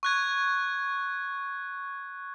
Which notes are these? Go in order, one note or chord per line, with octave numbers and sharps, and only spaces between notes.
C#6 F#6 G#6